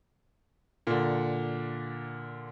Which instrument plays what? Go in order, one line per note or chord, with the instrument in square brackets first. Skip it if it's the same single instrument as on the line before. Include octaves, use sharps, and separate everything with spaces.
[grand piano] A#2 D3